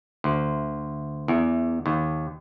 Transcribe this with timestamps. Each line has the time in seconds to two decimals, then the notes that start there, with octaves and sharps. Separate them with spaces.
0.24 D2
1.28 E2
1.86 D#2